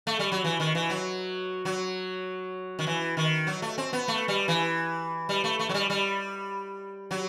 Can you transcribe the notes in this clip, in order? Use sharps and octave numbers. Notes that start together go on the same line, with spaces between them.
A3
G3
F#3
E3
D#3
E3
F#3
F#3
D#3
E3
D#3
F#3
A3
C4
B3
A3
G3
E3
G3
A3
A3
F#3
G3
G3
F#3